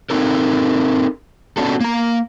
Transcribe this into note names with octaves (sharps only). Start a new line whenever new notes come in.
C4 D#4 A4 A#4
B3 C#4 D4 F#4 A4
A#3 A#5